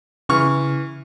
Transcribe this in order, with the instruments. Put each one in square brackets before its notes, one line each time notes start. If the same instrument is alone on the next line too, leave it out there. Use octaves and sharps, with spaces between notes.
[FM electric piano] C#3 [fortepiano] E3 C#6 F6